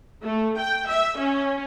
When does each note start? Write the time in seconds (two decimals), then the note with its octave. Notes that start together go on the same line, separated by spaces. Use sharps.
0.23 A3
0.58 G5
0.88 E5
1.18 C#4